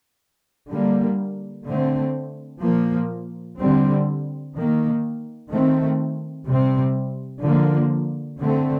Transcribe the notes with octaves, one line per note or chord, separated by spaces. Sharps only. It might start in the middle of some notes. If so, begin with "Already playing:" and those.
D3 G3 A#3
D3 A3 C4
A#2 F3 A#3
D3 G3 C4
D#3 A#3
D#3 A3 C4
C3 G3 C4
D3 F3 A#3
D3 A3 C4